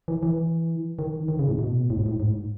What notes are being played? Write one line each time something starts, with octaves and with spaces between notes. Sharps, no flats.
E3
E3
D#3
D#3
C#3
A2
B2
A2
G#2
A2
G#2